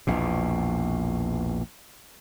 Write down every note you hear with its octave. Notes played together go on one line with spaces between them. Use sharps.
A#1 E2 B2